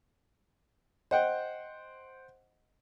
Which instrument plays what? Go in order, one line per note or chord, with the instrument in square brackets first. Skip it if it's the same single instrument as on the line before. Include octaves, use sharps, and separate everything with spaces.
[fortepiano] C5 F#5 G5 [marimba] D#5